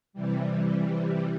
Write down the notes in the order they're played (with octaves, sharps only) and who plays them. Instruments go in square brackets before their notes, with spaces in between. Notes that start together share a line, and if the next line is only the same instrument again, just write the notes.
[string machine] C3 E3 G3